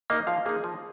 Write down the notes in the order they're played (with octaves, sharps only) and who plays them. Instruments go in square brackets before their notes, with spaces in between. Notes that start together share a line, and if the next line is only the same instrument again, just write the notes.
[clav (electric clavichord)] A#3 D#4 [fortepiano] D#5
[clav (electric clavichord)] F3 [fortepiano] F5
[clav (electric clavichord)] A#3 D#4 [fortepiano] G#4
[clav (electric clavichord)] F3